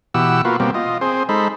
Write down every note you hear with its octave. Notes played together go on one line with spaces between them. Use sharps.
B2 E3 G4 F#5 E6
A#3 F4 F#4 B4
B2 G3 A#3 C4
F4 D#5
C4 G#4 C5
G#3 D#4 A4 C5 B5